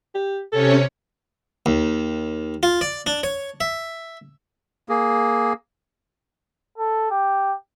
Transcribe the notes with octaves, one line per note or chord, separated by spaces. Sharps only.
G4
C3 C#4 A4 C#5
D#2
F4
D5
D4
C#5
E5
A#3 G#4
A4
G4